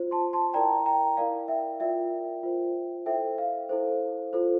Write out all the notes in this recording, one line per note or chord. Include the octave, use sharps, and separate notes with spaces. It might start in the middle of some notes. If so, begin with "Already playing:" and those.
Already playing: F4 C5
A5 C6
A5 C6
E4 A#4 D5 G5 A#5
G5 A#5
E4 A#4 D5 F5
E5 G5
F4 A#4 D5 E5 G5
F4 C5
E4 A4 C5 E5 G5
F5
E4 A4 C5
F4 A4 C5